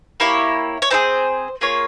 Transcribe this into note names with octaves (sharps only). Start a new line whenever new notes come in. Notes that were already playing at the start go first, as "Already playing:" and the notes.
A#3 E4 G4 C#5
C#5
C4 E4 G#4 C5
A#3 F4 G#4 C#5